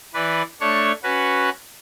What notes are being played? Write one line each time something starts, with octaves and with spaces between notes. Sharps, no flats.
E3 B4 D5
A3 D4 C#5 C#6
C#4 F#4 B4